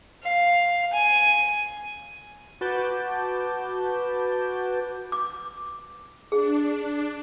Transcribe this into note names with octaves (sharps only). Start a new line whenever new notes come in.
F5
G#5
F#4 B4 A5 D6 G6
D6
D4 G#4